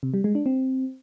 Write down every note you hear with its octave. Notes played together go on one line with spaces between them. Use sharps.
C3
G3
G#3
D4
C4